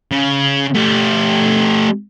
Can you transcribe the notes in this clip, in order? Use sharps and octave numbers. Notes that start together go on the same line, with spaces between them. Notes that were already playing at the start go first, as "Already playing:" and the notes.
C#3
A3 G4